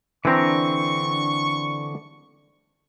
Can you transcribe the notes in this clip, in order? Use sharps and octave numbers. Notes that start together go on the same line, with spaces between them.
D3 E3 C4 D4 A#5 C#6